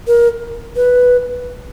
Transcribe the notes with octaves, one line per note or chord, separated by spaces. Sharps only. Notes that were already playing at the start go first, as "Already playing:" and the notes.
A#4
B4